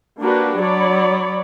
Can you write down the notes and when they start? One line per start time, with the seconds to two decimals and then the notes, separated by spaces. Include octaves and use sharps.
0.21 A#3 D4 F#4 G4 B4
0.58 F#3 C#5 D5 B5